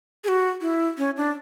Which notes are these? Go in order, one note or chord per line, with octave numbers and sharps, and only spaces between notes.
G#4
F#4
E4
C#4
D4